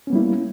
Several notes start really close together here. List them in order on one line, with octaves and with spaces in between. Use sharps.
C#4 B3 G3 E4 A#3